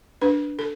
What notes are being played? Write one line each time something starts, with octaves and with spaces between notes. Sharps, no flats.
D4 B4
A4